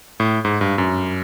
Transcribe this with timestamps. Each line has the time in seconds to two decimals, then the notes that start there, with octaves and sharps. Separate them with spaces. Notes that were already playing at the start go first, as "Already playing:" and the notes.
0.20 A2
0.45 G#2
0.61 G2
0.78 F#2